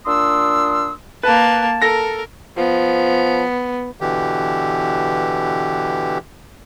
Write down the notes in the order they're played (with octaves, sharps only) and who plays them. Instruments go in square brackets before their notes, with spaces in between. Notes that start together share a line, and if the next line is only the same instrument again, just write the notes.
[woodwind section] A#2 D4 C6 D#6 E6
[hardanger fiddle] A#3 A5 [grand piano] B4
[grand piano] A4 A#6 [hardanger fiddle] A#4
[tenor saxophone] F3 [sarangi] B3
[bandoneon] B2 D3 E3 G4